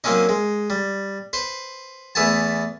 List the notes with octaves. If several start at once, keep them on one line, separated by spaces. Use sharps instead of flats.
F#3 A#3 C4 C#4 D#4
G#3
G3
B4 C5
E2 A3 B3 G#5 A5